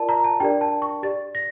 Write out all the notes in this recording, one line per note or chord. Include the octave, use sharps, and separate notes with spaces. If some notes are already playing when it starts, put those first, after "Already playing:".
Already playing: F4 A#4 D5 A5
A#5
A5
D4 G4 A#4 D5 G5
A5
C#6
G4 D5 A6
A#6